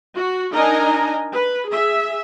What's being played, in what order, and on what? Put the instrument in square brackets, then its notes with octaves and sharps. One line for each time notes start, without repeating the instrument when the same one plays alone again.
[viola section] F#4
D4 D#4 A#4 D#5 G#5 A#5
B4
G#4 E5